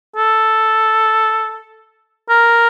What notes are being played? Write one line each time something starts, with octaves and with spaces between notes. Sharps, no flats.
A4
A#4